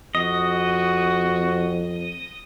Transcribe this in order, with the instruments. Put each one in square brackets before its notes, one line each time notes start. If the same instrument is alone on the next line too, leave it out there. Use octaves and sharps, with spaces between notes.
[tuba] F2 [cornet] F#4 [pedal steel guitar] D#5